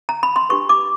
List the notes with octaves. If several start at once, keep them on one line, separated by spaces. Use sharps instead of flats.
A#5
B5
C6
D4 G4 B4 C#6
D6